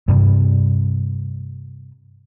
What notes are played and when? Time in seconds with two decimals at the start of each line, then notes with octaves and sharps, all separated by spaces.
0.08 G2 C3 G3